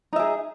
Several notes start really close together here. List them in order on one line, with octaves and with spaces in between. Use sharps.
D#4 E5 G#4